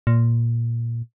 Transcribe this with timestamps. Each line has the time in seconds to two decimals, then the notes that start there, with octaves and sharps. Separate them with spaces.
0.07 A#2